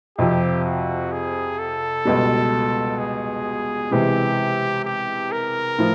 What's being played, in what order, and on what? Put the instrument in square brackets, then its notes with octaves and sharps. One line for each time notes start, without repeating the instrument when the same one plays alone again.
[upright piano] F2 C3 F3 [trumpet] G4
[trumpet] F#4
G#4
A4
[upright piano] C#2 B2 G3
[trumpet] G#4
[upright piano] C3 E3 G#3 [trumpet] G4
[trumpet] G4
A#4
[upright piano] A2 F3